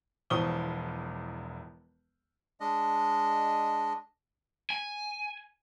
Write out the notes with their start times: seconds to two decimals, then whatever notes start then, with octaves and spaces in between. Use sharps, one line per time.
0.30 E1 E2 F3 C#6 D#6 G7
2.60 G#3 D4 D#5
4.70 G#5